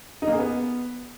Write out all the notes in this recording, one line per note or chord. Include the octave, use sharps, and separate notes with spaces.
D#4
A#3
G#4
B3